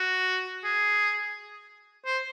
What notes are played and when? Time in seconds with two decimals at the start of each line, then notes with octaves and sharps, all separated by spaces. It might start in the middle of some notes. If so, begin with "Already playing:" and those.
Already playing: F#4
0.64 G#4
2.06 C5